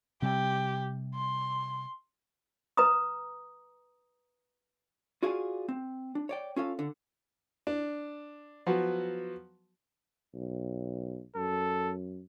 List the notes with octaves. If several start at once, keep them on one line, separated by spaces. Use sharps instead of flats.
C3 G3 G4
C6
B4 A#5 D#6
F4 F#4 G#4 D5 F5 G#5
C4
D4
C#5 D5 G5
C#4 F4 A4 F5
D3
D4
F3 F#3 B3 F#4
B1
F#2 A4